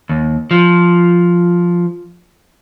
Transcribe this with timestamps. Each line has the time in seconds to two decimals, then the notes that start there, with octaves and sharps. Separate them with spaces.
0.09 D#2
0.51 F3